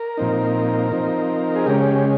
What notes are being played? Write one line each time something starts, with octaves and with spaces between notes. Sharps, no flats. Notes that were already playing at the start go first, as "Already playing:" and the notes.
Already playing: A#4
A#2 F3 C4 D#4
F3 C4 D#4
G#4
C#3 G#3 C#4 G4